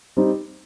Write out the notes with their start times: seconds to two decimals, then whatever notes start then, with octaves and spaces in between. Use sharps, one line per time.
0.17 G3 C4 D#4